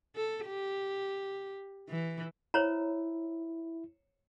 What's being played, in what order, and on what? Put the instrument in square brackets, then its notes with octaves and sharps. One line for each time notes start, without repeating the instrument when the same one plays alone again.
[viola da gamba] A4
G4
E3
[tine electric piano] E4 [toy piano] C5 C#5 A#5